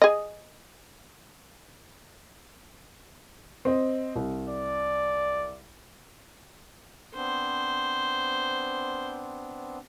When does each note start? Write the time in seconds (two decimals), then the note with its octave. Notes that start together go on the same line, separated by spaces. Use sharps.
0.02 G#4 D#5
3.65 C4 D#5
4.16 C2
4.49 D5
7.15 B3 C4 D4 C5